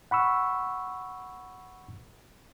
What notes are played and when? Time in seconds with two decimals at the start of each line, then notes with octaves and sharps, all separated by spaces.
0.11 F#5 B5 C#6 E6